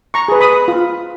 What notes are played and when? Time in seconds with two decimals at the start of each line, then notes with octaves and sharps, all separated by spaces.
0.14 A#5 C#6
0.28 G#4 B4
0.40 B5 D#6
0.68 F4